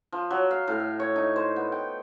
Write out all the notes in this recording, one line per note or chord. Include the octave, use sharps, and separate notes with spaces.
F3
F#3
F5
A2
E5
C#5
D#4
C5
B3
G5